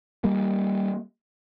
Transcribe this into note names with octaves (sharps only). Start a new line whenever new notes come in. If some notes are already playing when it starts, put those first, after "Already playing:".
G3 A#3